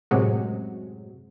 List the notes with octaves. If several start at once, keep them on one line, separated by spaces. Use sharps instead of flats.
F#2 A2 C3 F#3 G#3